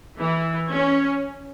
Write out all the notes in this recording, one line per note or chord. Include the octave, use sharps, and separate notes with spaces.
E3
C#4